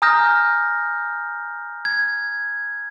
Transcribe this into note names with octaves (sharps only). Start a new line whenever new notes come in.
G#5 A#5 D#6 F6 G6 A#6
G#6